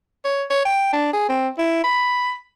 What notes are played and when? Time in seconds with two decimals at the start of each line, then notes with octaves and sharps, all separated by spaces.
0.25 C#5
0.50 C#5
0.65 G5
0.93 D4
1.13 G#4
1.29 C4
1.58 E4
1.84 B5